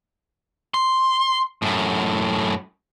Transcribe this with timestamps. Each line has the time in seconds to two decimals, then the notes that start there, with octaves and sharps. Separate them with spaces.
0.74 C6
1.62 F#2 A2